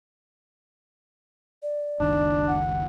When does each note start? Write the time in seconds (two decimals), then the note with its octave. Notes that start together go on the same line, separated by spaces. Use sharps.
1.62 D5
2.00 F#1 C#2 D#3 D4
2.47 F#5